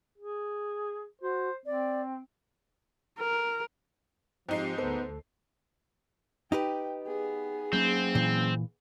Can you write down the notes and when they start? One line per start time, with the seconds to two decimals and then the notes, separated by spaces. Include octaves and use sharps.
0.18 G#4
1.22 F#4 C5
1.66 C4 D5
3.19 A#4
4.49 G#2 F3 C4 D#4 G4 C7
4.78 D2 B3 A4 C5
6.52 D#4 G4 B4 G5
7.05 B3 G#4
7.73 F#3 A#3 C4 C#4
8.15 A#2 E3